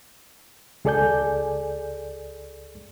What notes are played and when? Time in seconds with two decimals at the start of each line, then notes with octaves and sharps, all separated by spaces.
0.85 C#2 G#4 A4 D5 G#5 G6